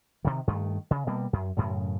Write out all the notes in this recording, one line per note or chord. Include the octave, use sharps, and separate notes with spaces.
C3 D#3
G2 D#3 A3
C#3
B2 G3 A#3
F#2
F#2 A2 C#3